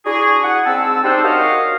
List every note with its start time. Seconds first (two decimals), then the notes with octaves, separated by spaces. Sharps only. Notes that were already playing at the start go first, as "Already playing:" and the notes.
0.06 D4 E4 F#4 G#4
0.44 F#5
0.65 G#2 C4 A5 E6
1.04 G3 D4 D#4 A4 C5
1.24 F#4 A#4 C#5 D#5 F5